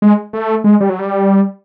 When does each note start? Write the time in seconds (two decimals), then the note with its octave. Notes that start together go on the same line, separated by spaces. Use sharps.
0.02 G#3
0.33 A3
0.64 G#3
0.80 G3
0.89 F#3
0.99 G3